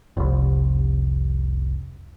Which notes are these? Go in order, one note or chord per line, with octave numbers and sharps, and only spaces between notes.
F1 C2